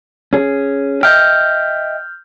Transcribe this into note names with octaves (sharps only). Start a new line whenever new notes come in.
C#4 G#4
D#5 E5 G5 F6 G6